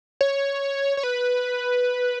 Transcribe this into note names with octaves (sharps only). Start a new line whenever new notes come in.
C#5
C#5
B4